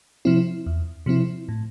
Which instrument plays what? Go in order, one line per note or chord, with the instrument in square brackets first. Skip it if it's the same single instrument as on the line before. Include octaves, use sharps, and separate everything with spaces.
[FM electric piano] C3 F3 C4 E4
E2
C3 F3 C4 E4
A2